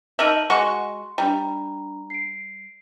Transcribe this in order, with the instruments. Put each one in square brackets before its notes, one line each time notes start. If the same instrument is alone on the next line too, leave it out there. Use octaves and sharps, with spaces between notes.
[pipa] D#4 A#4 E5 [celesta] A5 D#7 F#7
[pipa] G#3 F#4 C#6 [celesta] C6
[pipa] G3 [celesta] D4 A#5
[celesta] C7 D7